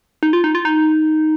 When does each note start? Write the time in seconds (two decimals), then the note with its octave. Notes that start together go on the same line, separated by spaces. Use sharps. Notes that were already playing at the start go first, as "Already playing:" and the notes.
0.23 D#4
0.33 F4
0.44 D#4
0.55 F4
0.65 D#4